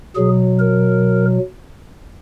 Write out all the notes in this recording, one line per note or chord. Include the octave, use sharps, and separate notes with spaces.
B2 F#3 G#4
A#4